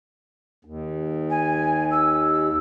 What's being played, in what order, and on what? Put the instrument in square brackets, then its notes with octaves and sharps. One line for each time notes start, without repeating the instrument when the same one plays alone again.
[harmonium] D#2
[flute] G#5
E6